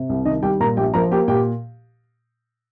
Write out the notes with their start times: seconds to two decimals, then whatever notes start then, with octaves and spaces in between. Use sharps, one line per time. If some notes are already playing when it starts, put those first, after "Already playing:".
Already playing: C3
0.09 C2
0.25 D#3 D#4 D#5
0.43 G3 G4 G5
0.60 A#2 A#4 A#5
0.77 A#1 G4 G5
0.94 F3 A#4 A#5
1.11 A#3 G4 G5
1.28 A#2 G4 G5